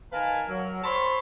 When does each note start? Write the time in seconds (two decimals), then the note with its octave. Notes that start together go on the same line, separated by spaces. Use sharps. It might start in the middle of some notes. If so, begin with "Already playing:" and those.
0.12 D#3 A#4 B4 F5 G#5 A5
0.48 F#3 A#4
0.84 C5 C#5 A5 B5 C6